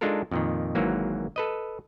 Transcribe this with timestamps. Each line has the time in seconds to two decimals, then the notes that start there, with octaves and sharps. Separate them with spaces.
0.01 G#3 D4 D#4 F4 A4 A#4
0.32 F2 A#2 D#3
0.75 G#1 G#2 E3 F#3 A#3
1.36 A4 B4 D#5